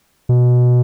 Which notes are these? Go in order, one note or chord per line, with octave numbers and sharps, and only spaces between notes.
B2